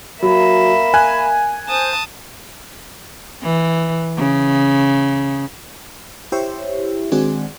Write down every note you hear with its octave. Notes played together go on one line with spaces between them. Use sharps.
F#3 A#3 E5 B5
G#5 F#6
C5 A5 D#6
E3
C#3
E4 G4 C5 C#5 E5
D#3 G#3 C4 D4 F#4 G#4